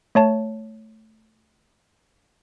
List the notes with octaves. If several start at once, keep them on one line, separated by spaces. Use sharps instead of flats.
A3 C#5 A5